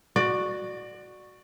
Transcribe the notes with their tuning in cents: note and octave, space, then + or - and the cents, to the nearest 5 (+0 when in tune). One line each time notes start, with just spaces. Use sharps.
F#4 -5 D5 +20